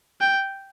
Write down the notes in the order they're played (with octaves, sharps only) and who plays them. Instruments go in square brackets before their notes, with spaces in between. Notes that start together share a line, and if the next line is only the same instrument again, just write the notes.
[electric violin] G5